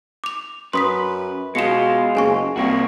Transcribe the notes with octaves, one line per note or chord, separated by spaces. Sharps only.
D6 F7
F#2 B4 C6 D#6 B6
B2 G#3 F4 C#7 E7
F#1 G#4 G#5 C#6
C2 A#3 C4 F#4